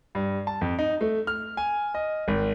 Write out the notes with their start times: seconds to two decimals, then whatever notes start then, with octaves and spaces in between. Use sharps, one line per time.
0.15 G2
0.47 A5
0.61 F2
0.79 D#4
1.01 A3
1.27 F6
1.57 G#5
1.94 D#5
2.28 G#1